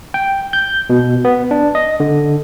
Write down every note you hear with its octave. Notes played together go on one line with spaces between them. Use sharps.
G5
G6
B2
B3
D4
D#5
D3